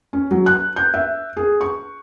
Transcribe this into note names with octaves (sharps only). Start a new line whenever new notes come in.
C#4
F#3
F#6
G6
E5
G#4
C#6